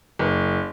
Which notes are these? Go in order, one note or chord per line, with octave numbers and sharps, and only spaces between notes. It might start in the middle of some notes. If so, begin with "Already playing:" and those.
F#1